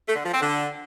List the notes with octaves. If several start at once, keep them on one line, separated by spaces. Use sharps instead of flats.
A3
D3
F3
C4
D3